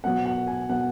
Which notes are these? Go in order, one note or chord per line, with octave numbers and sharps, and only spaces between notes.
B2 F#3 B3 F#5
F#5
G#5
B2 F#3 B3 F#5